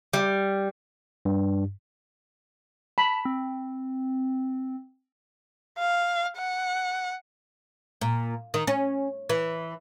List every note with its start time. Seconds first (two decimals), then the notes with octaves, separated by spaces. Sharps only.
0.13 G3
1.25 G2
2.98 A5 B5
3.25 C4
5.79 F5
6.38 F#5
8.01 A#2
8.54 D#3
8.67 C#4
9.29 E3